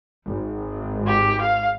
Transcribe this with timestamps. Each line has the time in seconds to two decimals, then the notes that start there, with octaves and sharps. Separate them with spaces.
0.24 G#1
1.08 G4
1.41 F5